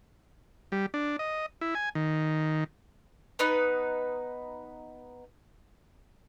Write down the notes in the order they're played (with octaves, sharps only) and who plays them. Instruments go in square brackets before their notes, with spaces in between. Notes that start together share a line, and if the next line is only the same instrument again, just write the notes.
[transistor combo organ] G3
D4
D#5
E4
G#5
D#3
[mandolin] B3 D#4 B4